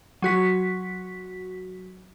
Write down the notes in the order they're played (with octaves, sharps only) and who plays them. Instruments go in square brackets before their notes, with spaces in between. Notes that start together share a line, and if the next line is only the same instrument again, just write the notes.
[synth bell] F#3 F#4 B6